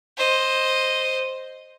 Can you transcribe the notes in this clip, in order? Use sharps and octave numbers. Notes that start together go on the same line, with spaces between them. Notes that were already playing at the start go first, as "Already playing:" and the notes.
C5 D#5